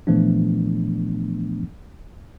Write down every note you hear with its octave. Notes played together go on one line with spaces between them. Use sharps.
A#2 E3 F3 A3 B3 D4